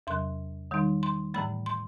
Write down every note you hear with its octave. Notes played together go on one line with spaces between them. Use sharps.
E2 C3 F#3 C6
D#3 G3 D#4
C6
A2 E3 A3 B5
C6